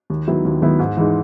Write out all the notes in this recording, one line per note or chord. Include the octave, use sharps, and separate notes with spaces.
D#2
D#3 F#3 B3 E4
D#2
D#3 F#3 B3 E4
G#2
E3 G#3 D#4